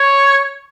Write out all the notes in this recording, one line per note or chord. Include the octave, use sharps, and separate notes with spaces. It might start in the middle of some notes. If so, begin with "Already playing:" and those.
Already playing: C#5